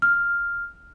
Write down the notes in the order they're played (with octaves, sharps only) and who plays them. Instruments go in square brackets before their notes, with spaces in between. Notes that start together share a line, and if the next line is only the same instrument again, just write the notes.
[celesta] F6